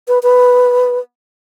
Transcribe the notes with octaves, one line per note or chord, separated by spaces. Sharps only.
B4
B4